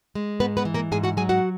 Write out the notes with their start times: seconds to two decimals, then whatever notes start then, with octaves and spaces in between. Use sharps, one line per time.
0.15 G#3
0.40 G#2 B3 B4
0.57 B3 B4
0.65 E3
0.74 A#3 A#4
0.92 G#2 G#4 G#5
1.03 F#4 F#5
1.17 F#3 G#4 G#5
1.29 F#4 F#5